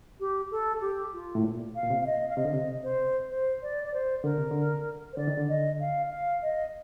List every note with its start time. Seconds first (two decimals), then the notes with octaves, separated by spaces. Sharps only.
0.20 G4
0.51 A4
0.81 G4
1.13 F4
1.35 A2
1.44 A#2
1.75 F5
1.83 A#2
1.90 C3
2.01 F5
2.06 D#5
2.30 F5
2.37 C3 D#5
2.45 D3
2.53 C3
2.83 C5
3.30 C5
3.62 D5
3.85 D5
3.94 C5
4.24 D3 A#4
4.38 C3
4.51 D3
5.13 C5
5.17 D3 D5
5.27 D#3
5.38 D3
5.49 D#5
5.80 F5
6.10 F5
6.42 D#5